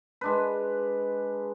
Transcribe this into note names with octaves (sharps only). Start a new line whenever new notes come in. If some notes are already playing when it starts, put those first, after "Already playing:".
G#3 D4 B4